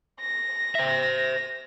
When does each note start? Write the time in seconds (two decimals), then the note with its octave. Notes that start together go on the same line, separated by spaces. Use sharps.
0.20 A#6
0.75 C5 E5